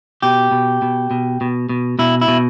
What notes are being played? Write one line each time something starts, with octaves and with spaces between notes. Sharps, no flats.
B2 G4
B2
B2
B2
B2
B2
B2 E4
E4
B2